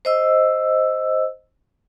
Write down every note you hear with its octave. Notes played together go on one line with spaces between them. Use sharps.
C5 D#5 E6